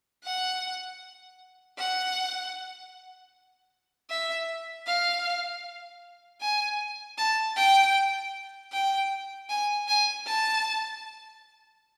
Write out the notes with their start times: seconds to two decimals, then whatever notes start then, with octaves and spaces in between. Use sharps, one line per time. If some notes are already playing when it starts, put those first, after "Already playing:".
0.24 F#5
1.79 F#5
4.10 E5
4.87 F5
6.41 G#5
7.18 A5
7.56 G5
8.72 G5
9.49 G#5
9.88 G#5
10.26 A5